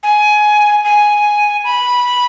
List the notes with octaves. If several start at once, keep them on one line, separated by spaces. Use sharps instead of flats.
G#5
G#5
B5